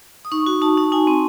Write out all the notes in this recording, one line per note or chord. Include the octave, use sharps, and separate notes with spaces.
D#6
D#4 C#6
F#4
D#4 A5
D#4
D#4 G#5
C4